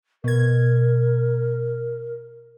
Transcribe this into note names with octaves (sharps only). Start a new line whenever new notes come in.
B2 A#4 G#6